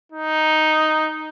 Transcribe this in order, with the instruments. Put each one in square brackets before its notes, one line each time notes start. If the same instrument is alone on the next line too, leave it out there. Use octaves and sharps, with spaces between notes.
[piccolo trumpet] D#4